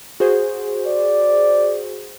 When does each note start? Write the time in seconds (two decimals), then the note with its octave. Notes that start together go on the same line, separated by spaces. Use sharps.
0.20 F#4 G#4 C5
0.87 D5